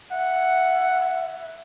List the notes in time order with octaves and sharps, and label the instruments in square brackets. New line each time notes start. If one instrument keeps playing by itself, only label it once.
[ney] E5 [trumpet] F#5